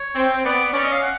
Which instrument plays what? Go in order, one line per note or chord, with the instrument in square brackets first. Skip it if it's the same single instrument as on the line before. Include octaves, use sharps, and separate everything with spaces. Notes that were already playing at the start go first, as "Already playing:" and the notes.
Already playing: [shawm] C#5
[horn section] C4
[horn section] B3 [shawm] D5
[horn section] C#4 [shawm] D5
[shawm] D#5
F5
F#5